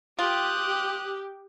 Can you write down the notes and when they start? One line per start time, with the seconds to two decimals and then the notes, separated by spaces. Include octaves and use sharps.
0.19 F4 G4 D#6 F#6